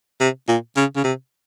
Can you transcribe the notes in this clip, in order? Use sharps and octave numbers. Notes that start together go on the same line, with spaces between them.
C3
A#2
C#3
C#3
C3